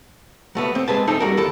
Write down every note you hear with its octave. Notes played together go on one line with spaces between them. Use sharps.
F#3 A3 B3
C4
G#3 G#4 B4 A5
A3 C4 D4 D#4 A4
G3 F#4 A#4
D#2 E4 A4